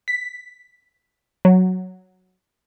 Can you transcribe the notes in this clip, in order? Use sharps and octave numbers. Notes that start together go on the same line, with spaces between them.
B6
F#3